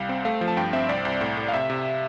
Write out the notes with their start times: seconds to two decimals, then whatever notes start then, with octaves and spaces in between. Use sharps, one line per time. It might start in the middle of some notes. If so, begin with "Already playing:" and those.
Already playing: C2 G3 F5
0.09 C4
0.25 A3 F5
0.41 F3
0.48 A5
0.57 G2 G5
0.73 C4 E5
0.89 C2 D5
1.05 C2
1.21 A2
1.37 A2
1.48 F5
1.53 C3 E5
1.70 C3